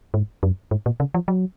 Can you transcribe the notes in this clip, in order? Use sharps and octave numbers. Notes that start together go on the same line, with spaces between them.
G#2
F#2
G#2
A#2
C#3
F3
F#3